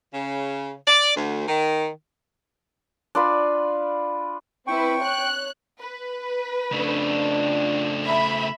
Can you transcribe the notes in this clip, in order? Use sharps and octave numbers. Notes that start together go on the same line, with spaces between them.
C#3
D5
D2
D#3
D4 F4 B4
C4 E4 B4 G5 C#6
C#5 F#6
B4
F2 C#3 A3 D4
E5 B5